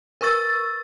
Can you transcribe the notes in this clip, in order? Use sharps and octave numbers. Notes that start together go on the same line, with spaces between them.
A#4 B4 C#6 E6 A6